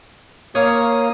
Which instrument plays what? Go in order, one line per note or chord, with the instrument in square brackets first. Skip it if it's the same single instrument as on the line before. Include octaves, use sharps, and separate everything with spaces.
[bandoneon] A#3 D#6 [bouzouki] C#5 F5